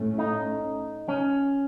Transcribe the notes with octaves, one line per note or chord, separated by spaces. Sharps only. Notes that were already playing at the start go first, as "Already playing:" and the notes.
Already playing: A2 A3 C#4
D#4
C#4